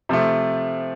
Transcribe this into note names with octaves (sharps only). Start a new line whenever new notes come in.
C3 F3 A3